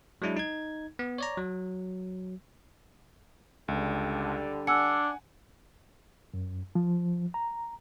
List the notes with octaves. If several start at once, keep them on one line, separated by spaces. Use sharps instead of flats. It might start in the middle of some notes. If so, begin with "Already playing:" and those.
F#3 G#3 D4 E4
D#4 G#6
B3
C#5 D5 A#5
F#3
C#2 D3 G3
D4 F#5 G#5 E6 C#7
F#2
F3
A#5